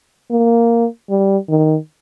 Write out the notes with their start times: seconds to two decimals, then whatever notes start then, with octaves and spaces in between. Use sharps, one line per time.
0.31 A#3
1.10 G3
1.49 D#3